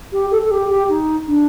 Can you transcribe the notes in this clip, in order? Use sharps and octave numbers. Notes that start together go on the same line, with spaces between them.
G4
A4
A4
G4
G4
D#4
D4